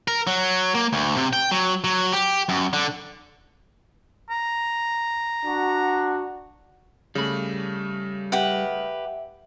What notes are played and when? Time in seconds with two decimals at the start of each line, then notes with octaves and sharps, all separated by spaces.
0.08 A#4
0.27 F#3
0.75 A#3
0.93 D2
1.16 C3
1.33 G5
1.51 F#3
1.84 F#3
2.13 G4
2.49 F#2
2.73 D3
4.30 A#5
5.45 D4 F#4
7.15 C#3 G3 A3 B5
8.32 G4 B4 E5 F#5